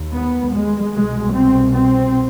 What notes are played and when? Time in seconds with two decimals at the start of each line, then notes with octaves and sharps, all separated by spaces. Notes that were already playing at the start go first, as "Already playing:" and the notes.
Already playing: D#2
0.14 B3
0.54 G#3
0.93 C2 B2 G#3
1.34 C4
1.73 C4